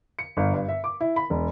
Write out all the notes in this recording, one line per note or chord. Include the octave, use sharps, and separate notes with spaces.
C#7
G1
G2
E5
D6
E4
B5
E1